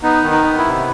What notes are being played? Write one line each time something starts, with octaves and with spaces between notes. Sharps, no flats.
B3 D#4
D#3
D#4
B3
E4
C3